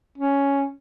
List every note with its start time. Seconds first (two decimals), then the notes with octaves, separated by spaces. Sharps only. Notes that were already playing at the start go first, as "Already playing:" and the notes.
0.18 C#4